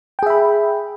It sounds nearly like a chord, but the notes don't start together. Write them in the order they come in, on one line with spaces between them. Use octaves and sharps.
G5 G#4 E5 B5